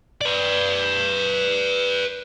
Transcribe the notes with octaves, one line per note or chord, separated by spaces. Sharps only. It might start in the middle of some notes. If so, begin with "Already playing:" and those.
B4 D5